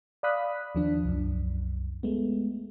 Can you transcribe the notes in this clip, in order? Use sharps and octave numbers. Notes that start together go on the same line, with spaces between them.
D5 F5 B5 D#6 F#6 B6
D#2 F3 D4
C2 F#2
G#3 A3 B3